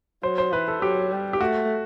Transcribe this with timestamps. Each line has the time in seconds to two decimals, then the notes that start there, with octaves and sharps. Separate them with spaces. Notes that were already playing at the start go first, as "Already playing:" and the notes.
0.23 F#3 C5
0.38 C5
0.52 E3 B4
0.68 A4
0.82 F#3 G4
1.12 G3
1.33 G4
1.41 A3 F#4